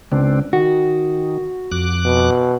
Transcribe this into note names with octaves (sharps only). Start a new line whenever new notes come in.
C#2 C4 D4
D#3 F#4
F2 D6 F#6
B2